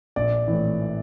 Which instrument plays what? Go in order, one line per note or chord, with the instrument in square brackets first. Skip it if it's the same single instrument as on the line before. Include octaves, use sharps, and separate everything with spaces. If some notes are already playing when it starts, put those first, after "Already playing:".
[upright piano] A#1 [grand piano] D5
[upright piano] A2 E3